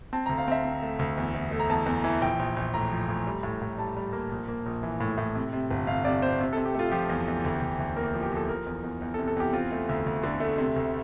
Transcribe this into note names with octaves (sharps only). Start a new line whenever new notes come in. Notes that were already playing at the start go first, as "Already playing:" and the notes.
C4 A5
D2 A#5
F5
C4 E5
C4
A3
D2
E2
E2
A3
A#5
E2 A5
E2
E3
A#1 G5
A#1
A#1
A2 A#5
F3
A2
G3
A2
A2
G3 A5
G3
A#3
A#1
A#3
A#1
E3
A2
A2
C3
C3
G1
C3 F5
C3 D5
C3 C5
C3
C3 A4
G4
A3 F4
F3 G4
E2
E2
D2
D2
D2
A#3 A#4
F3
G4
F3 A4
F3 A#4
E2
E2
E2
C3 A4
A4
E2 G4
C4 F4
A3
D2
D2
D3
A3
C3
D2